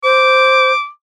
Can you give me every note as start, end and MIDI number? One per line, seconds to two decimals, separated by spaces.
0.04 0.72 72
0.04 0.88 86